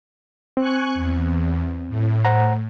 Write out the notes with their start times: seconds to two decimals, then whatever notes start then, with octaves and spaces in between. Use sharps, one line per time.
0.57 C4 G#5 C#6 F#6
0.95 E2
1.89 A2
2.25 C5 F#5 A#5